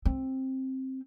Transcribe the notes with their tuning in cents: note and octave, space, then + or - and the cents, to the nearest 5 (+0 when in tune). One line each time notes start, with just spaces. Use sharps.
C4 +10